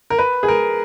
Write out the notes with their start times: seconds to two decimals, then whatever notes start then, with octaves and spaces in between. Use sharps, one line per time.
0.10 A#4
0.19 B4
0.43 G#4
0.48 A#4